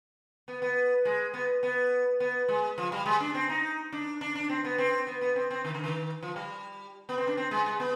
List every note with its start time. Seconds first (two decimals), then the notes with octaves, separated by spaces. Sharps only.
0.48 B3
0.62 B3
1.05 G#3
1.34 B3
1.63 B3
2.20 B3
2.48 G#3
2.78 F3
2.92 G3
3.06 G#3
3.20 D4
3.35 C4
3.49 D#4
3.92 D4
4.21 D4
4.35 D4
4.50 C4
4.64 B3
4.78 C4
5.07 B3
5.21 B3
5.36 C4
5.51 C4
5.64 D#3
5.74 D3
5.84 D#3
6.23 F3
6.36 G3
7.09 B3
7.18 C4
7.27 D4
7.37 C4
7.51 G#3
7.66 G#3
7.80 B3